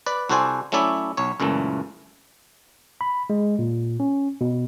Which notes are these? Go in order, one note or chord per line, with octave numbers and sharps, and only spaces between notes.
B4 D5
C2 F#4 A4 C5 D5 G#5
F#3 A3 C#4 E4 D5 E5
B1 C#5
C#2 F#2 A#2 E3 A3
B5
G#3
A#2
C#4
B2